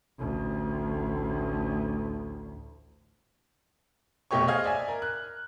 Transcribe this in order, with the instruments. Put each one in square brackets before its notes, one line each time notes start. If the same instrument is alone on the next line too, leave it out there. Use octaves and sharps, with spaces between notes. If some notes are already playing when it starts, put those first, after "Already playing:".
[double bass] A1 D2
[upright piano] F1 B2 A3 G4 C#5 C#6
G#4 C5 D#5 F5 F6 G#6
D5 E5 G#5
A#4
F#6